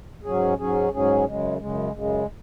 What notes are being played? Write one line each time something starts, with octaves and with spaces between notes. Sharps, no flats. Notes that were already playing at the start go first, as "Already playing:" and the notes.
G#2 F#3 C#4 G#4
G#2 F#3 C#4 G#4
G#2 F#3 C#4 G#4
F#2 C#3 G#3
F#2 C#3 G#3
F#2 C#3 G#3